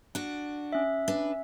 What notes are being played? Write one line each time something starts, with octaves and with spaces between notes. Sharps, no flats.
D4 F#4
C#4 E5
D4 B4